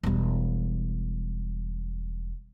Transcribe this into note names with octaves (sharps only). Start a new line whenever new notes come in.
E1 G3